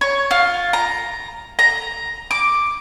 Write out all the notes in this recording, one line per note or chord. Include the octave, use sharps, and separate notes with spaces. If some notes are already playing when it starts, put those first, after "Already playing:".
C#5
F4
A#5
A#5
D6